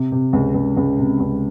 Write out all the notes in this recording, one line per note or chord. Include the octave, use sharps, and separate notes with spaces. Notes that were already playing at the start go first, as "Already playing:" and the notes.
Already playing: C3
C3
C#2
C#2
C#2
C3
C#2